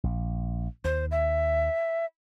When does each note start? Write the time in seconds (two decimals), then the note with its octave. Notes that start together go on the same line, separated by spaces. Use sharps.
0.04 A#1
0.84 D#2 C5
1.11 E5